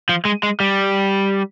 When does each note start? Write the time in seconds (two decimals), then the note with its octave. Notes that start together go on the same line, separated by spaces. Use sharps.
0.09 F3
0.25 G#3
0.43 G#3
0.60 G3